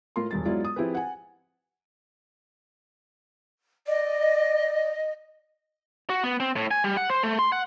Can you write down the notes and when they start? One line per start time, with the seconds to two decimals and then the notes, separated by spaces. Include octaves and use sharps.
0.16 A2 F4 A#4 C6
0.31 E1 G2 A6
0.45 F#3 G#3 B3 E4 F4 D5
0.64 D#6
0.76 F3 C4 E4 G4 G#4 B4
0.95 F#5 G#5
3.86 D5 D#5
6.10 F#4
6.24 B3
6.40 C4
6.56 A2
6.71 G#5
6.84 G3
6.97 F#5
7.10 C5
7.23 A3
7.39 C6
7.52 F#5